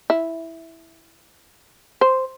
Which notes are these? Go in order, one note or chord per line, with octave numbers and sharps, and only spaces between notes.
E4
C5